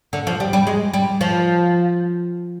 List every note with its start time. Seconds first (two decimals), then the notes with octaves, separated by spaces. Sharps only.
0.13 D3
0.27 F3
0.40 G3
0.53 G3
0.67 G#3
0.94 G3
1.21 F3